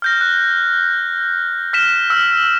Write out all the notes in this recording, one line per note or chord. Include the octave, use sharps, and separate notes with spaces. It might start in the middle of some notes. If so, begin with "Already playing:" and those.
F6 G6 A#6
F#6
F6 B6 E7
E6 F6